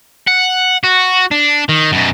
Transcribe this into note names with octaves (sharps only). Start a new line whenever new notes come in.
F#5
F#4
D4
D#3
F#2 B2